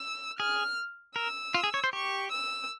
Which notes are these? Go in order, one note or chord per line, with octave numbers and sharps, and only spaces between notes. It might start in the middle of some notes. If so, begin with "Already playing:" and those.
Already playing: E6
G#4 F6
A#4 E6
F4
G#4
C#5
C5
G4 C#6
E6